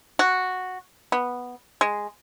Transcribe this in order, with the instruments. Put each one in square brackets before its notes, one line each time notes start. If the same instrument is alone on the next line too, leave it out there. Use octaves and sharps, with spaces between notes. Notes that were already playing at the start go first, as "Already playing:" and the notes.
[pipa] F#4
B3
G#3